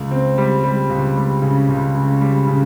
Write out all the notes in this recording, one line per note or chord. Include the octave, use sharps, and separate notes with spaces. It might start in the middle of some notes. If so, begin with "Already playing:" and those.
Already playing: C#2
C4
G3
G3
C#2
G3
C#3
C#2
C#3
G3
C#3